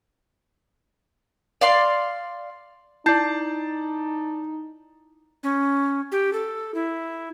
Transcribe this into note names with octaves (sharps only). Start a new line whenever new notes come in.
D5 F5 C6
D#4 E4 D5 A5 G6 C7
C#4
G4
A4
E4